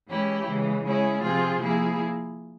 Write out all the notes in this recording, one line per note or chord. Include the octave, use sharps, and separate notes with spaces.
E3 G#3 C#4 E4 G4
C#3 E3 G#3
G#3 C#4 E4 G#4
C3 F3 C4 F4 G#4
F3 A#3 E4 G#4